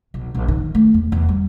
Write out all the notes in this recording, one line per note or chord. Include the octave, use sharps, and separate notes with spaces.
B1
A#1
D#3
A3
E2
E2
G3